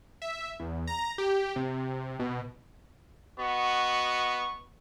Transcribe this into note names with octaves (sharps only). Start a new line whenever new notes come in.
E5
E2
A#5
G4
C3
B2
B3 F#4 D#5 C#6